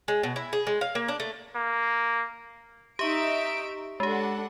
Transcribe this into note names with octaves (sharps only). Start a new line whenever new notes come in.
G#3
B2
E4
G#4
G#3
F5
A#3
D4
A3
A#3
D#4 G4 E5 C#6 D7
G#3 D4 G4 A4 F#5